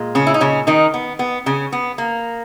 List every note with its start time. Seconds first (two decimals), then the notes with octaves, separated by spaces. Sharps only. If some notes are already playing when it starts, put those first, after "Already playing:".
Already playing: A#2 G#3
0.15 C#3 C#4
0.27 E4
0.34 D#4
0.41 C#3 C#4
0.67 D#3 D#4
0.94 B3
1.19 B3
1.46 C#3 C#4
1.72 B3
1.98 A#3